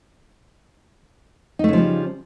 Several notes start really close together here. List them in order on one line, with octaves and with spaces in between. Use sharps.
D#4 A3 C#3 F3 G3